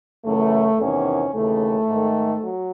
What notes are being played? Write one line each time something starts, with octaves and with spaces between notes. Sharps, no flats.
F#2 C#3 E3 A3
E2 C3 D#3 C#4
D#2 C#3 E3 A3
G#2 D#3
F#3